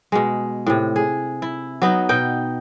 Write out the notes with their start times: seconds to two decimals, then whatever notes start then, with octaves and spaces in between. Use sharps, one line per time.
0.12 B2 G#3
0.66 A2 C3
0.96 G#4
1.42 E4
1.82 F#3 B3 D#4
2.09 B2 D#4 G5